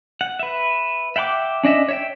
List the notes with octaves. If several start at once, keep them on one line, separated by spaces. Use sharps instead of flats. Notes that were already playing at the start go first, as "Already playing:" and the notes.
F#5
B4 E5
E5 F#5 G5 B5 D6
C#4 D4 D#5 E5
C#5 E5 G5